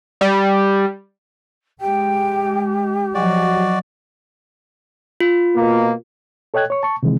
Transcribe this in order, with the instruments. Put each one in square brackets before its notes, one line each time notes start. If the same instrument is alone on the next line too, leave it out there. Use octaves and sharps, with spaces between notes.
[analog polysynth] G3
[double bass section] G#3 [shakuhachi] G4 [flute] G5
[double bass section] F3 F#3 [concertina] F#4 D5 [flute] D#5
[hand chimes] F4
[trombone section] B2 A#3
[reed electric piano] A4 C#5 D#5 G5 F#6 G#6
C#5 C#6
A5 C#6
C3 D#3 E3 G#3 C4